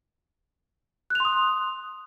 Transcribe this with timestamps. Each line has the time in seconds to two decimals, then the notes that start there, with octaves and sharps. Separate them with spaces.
1.10 F#6
1.15 F7
1.20 C6
1.25 D#6